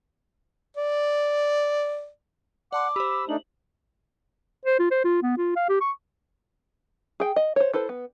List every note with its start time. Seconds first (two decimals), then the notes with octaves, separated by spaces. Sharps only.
0.77 D5
2.73 D5 F#5 A5 C6 D6
2.96 G4 C5 B5 E6
3.29 A3 D4 D#4 F#7
4.66 C5
4.80 F4
4.91 C5
5.04 F4
5.23 B3
5.38 F4
5.56 F5
5.69 G4
5.81 C#6
7.20 G#4 G5
7.36 D#5
7.56 C5 C#5
7.74 E4 A4 B4 C5
7.89 B3